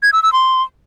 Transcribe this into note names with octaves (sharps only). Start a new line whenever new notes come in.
G#6
E6
E6
C6